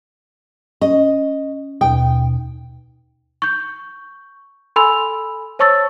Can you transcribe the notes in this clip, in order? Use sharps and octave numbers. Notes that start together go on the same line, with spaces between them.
C#4 D#5
D#2 B2 G5
C#6 G6
A4 G#5 B5 C6 E6 F7
C5 C#5 A5 C#6 E6 A6